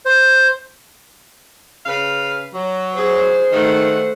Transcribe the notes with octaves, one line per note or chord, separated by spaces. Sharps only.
C5
C#3 B4 F5
F#3
G#4 C5
D#3 A3 F#5